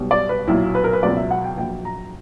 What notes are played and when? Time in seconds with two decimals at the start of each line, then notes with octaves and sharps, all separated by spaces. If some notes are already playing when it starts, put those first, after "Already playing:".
Already playing: B1 B2 G3
0.11 D5
0.29 B4
0.48 B1 A#2 F#3 E4
0.75 B4
0.84 A#4
0.93 B4
1.03 C#2 B2 F#3 D5
1.16 E5
1.31 F#5
1.44 G5
1.57 A#1 A#2 F#3 G5
1.85 A#5